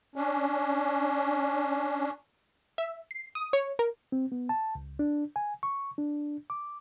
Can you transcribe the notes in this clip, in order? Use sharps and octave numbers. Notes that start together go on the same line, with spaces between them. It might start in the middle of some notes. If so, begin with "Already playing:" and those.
C#4 D4
E5
C7
D#6
C#5
A#4
C4
B3
A5
C#2
D4
G#5
C#6
D4
D6